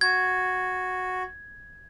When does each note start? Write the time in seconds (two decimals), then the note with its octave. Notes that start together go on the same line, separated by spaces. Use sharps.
0.01 F#4 G#6